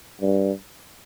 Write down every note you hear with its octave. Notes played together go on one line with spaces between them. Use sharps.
G2